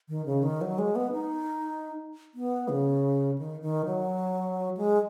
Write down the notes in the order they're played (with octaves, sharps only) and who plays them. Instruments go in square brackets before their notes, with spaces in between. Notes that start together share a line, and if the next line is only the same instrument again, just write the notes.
[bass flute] D#3
C#3
D#3
F#3
G#3
B3
D#4
B3
C#3
D#3
D#3
F#3
G#3